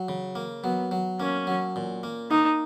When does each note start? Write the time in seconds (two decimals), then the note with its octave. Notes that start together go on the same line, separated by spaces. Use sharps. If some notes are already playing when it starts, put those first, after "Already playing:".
Already playing: F#3
0.08 C#3
0.35 A#3
0.64 F#3 B3
0.91 F#3
1.20 A#3 C#4
1.47 F#3
1.76 A#2
2.03 A#3
2.31 A#3 D#4